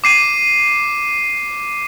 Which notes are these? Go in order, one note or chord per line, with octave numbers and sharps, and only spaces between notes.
D6 C7 D#7